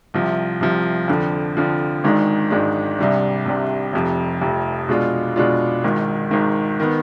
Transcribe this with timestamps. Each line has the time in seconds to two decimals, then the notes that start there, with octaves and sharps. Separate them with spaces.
0.14 C2 C3 F3
0.61 C2 C3 F3
1.08 F2 D3 F3
1.57 F2 D3 F3
2.04 G#1 G#2 D#3 G#3 D4
2.51 G#1 G#2 D#3 G#3 D4
2.98 C2 C3 G3 D4
3.46 C2 C3 G3 D4
3.93 F1 F2 C3
4.41 F1 F2 C3
4.89 B2 G#3 D4 F4
5.36 B2 G#3 D4 F4
5.84 G#1 G#2 D#3
6.31 G#1 G#2 D#3
6.80 D#3 B3